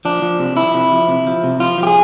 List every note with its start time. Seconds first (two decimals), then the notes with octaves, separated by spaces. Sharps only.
0.05 F3 D4
0.22 F3
0.40 C3
0.57 F3 E4
0.74 C3
0.92 F3
1.08 C3
1.27 F3
1.44 C3
1.60 F3 F4
1.78 F3
1.83 G4
1.87 G#4